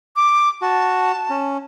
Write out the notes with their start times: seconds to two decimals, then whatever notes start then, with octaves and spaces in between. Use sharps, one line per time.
0.16 D6
0.62 F#4 A5
1.30 C#4